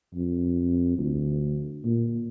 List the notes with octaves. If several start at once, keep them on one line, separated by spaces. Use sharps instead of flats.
F2
D2
A#2